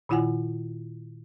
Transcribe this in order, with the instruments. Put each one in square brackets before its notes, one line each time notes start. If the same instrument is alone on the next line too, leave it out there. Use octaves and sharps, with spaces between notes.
[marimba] A#2 D#3 E4 F4 F#5 G#5